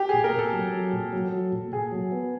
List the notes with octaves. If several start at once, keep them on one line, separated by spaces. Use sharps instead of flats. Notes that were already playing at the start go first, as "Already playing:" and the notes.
Already playing: G4
A#2 G#4
A#4
A#2
A4
F#3
F#3
A#2
F#3
F#3
A#2
A#2 G#4
F#3
B3